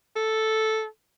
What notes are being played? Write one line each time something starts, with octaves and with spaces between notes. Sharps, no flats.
A4